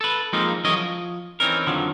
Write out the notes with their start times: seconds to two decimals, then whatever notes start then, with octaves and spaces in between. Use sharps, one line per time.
0.01 A4 B4
0.33 F3 G#3 A#3 C4 D#4 G#4
0.64 E3 F#3 C#4 G#4 A#4 D#5
0.76 F3
1.40 E3 C4 C#4 D#4 A#4
1.67 F2 D3 D#3 F3 F#3